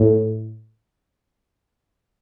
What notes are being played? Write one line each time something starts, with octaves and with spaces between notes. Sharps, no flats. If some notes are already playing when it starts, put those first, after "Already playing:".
Already playing: A2